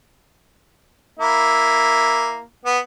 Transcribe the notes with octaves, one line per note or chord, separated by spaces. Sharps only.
A#3 E4
B3